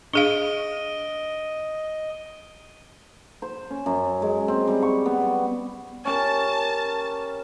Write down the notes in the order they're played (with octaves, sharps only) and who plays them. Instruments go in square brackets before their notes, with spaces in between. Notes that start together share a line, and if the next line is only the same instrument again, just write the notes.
[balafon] D4 G#4 F5 [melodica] D#5 [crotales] D7 D#7 G7
[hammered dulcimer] C5
C#4
F#2
G#3
C4
G3
C#6
B3
G3
[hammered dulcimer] C#4 G4 A#4 [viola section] A5